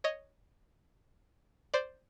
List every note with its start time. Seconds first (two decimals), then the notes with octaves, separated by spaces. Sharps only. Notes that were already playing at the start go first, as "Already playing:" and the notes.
0.04 C#5 D#5
1.74 C5 D5